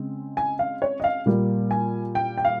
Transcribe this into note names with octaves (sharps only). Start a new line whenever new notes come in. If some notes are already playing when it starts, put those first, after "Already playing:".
Already playing: C#3 G#3 C4
G#5
F5
C#5
D#5
F5
A#2 G3 A#3
G#5
G5
G5
F5